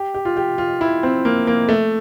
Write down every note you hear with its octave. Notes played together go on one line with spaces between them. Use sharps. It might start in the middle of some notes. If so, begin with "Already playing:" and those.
Already playing: G4
G4
F4
G4
F4
E4
C4
A#3
A#3
A3